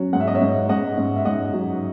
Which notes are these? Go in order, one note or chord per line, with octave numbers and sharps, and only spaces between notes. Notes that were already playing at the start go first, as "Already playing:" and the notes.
Already playing: F#3 C#4 F#4
G#2 F#5
E5
D#5
C#5 E5
G#2
G#2 D#5 F#5
G#2
E5
G#2 D#5 F#5
F#3